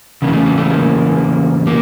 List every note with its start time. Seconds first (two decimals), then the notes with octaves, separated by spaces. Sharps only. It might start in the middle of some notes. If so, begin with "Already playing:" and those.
0.22 E2 C#3 A#3
0.33 A3
0.46 A#3
0.57 A3
0.70 A#3
1.67 A#3